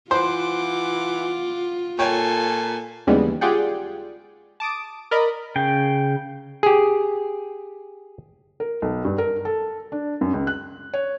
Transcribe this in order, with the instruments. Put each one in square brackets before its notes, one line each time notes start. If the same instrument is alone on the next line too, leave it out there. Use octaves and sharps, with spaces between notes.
[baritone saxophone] E3 [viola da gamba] F4 [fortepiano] C5 [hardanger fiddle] F#5 D6
[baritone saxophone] A#2 [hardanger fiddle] A4 G#5 [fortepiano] C#5 G5
[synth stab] D#2 C#3 E3 G3 G#3 B3
F4 G4 G#4 D5 F#5 G5
A5 D6 D#6 D7
A#4 D5 D#5 A#5 B5
[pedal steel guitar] C#3 G5
[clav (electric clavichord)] G4 G#4
[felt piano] A#4
B1
G2
A#4
A4
D4
F#2
C#2
F#6
C#5